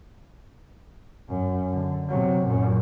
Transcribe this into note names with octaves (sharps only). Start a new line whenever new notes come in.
F#2
D3
C3 F#3
F#2 A#2